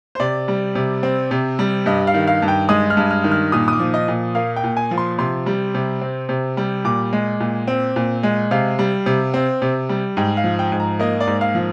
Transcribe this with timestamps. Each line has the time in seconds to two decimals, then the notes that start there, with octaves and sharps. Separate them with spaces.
0.15 C5
0.20 C3 D5
0.48 G3
0.75 C3
1.03 C4
1.31 C3
1.59 G3
1.86 G2 D#5
2.07 F5
2.14 D#3
2.27 F5
2.42 G2
2.48 G5
2.69 G#3 D#6
2.90 F6
2.97 G2
3.11 F6
3.24 D#3
3.31 F6
3.52 A#2 D#6
3.68 D#6
3.73 D6
3.79 F3
3.94 D#5
4.08 A#2
4.35 A#3 F5
4.56 G5
4.64 A#2
4.77 G#5
4.91 F3
4.98 C6
5.18 C3 C6
5.46 G3
5.74 C3
6.01 C4
6.29 C3
6.57 G3
6.85 A#2 D6
7.13 G#3
7.40 A#2
7.67 C4
7.96 A#2
8.23 G#3
8.51 C3 F5
8.79 G3
9.06 C3
9.34 C4
9.62 C3
9.89 G3
10.17 G#2 G5
10.37 F5
10.44 F3
10.59 G5
10.72 G#2
10.80 A#5
10.99 A#3 D#5
11.20 D5
11.27 G#2
11.41 F5
11.55 F3